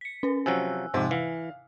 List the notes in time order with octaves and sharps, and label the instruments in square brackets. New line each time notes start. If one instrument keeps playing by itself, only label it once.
[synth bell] B6 C#7
C#4 B4
[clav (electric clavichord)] C3 F3 F#3 [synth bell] G#5 E6 F#6
[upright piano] F2 G#2 C3
[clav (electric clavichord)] E3 [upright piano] F5